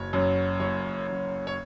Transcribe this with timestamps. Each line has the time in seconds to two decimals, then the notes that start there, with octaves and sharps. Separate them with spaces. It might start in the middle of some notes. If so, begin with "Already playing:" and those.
Already playing: F#1 C#5
0.13 F#2 F#3
0.60 F#1 C#5
1.07 F#2 F#3
1.47 C#5